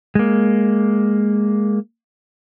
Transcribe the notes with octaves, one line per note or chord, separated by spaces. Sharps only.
G#3 A#3